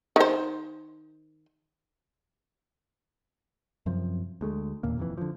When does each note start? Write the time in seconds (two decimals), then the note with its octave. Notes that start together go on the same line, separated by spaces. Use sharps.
0.16 D#3 C5
3.86 F#2 C3 F3
4.41 D2 G#3 A3
4.83 E1 D#2 A#2 A#3
4.98 F1 F2 A2 E3
5.17 D3 F3